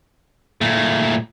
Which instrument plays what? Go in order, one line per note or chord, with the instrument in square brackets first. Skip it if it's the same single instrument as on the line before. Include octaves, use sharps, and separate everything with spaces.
[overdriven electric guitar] A#2 A3